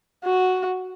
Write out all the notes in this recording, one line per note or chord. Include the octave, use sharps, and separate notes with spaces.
F#4